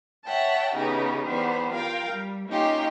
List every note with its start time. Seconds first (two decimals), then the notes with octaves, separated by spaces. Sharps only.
0.24 C#5 E5 F#5 G5 A5
0.73 C#3 E3 B3 D#4 G4
1.25 E2 G3 B3 C5
1.72 F4 A#4 F5 G5
2.11 G3
2.48 A#3 C#4 D#4 F4 G4